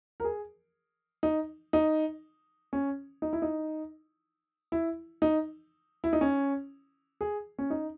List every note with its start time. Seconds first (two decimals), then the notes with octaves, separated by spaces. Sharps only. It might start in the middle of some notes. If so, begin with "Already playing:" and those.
0.20 A#4
0.24 G#4
1.23 D#4
1.73 D#4
2.73 C#4
3.22 D#4
3.33 E4
3.42 D#4
4.72 E4
5.22 D#4
6.04 E4
6.13 D#4
6.21 C#4
7.21 G#4
7.59 C#4
7.70 D#4